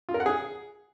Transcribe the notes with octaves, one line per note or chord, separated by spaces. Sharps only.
F4
A#4
F#5
G#4